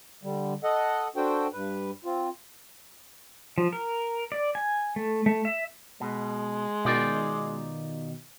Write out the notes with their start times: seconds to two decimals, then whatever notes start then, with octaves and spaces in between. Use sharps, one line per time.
0.23 D3 G3
0.63 A4 D#5 F#5
1.16 D4 F#4 A4 C5 G5
1.53 G2 B4
2.05 C4 F4
3.58 F3
3.73 A#4
4.32 D5
4.55 G#5
4.96 A3
5.26 A3
5.45 E5
6.01 B2 G#3
6.85 B2 D#3 D#4 F4 D5